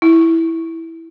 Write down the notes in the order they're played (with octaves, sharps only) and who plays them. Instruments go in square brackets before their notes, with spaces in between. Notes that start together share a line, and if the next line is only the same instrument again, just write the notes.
[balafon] E4